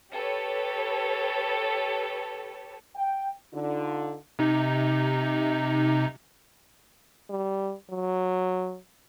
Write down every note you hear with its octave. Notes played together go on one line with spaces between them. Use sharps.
G4 A4 B4 C#5
G5
D3 D#4 F4
C3 D#4
G3
F#3